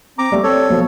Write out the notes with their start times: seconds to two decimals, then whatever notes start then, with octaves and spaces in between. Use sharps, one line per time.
0.19 C4 A#5 D6
0.32 G3 A3
0.43 C4 A4 C#5
0.70 B1 F3